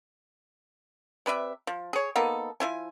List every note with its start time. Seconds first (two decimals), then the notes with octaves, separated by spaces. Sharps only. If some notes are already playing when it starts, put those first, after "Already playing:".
1.26 C3 B4 D5 E5
1.67 F3
1.93 G#4 C#5
2.16 A#3 B3 D#4 A4
2.60 F3 E4 G#5